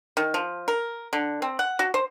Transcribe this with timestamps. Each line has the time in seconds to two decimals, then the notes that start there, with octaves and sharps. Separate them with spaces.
0.17 D#3
0.34 F3
0.68 A#4
1.13 D3
1.42 C4
1.59 F#5
1.79 F#4
1.94 C5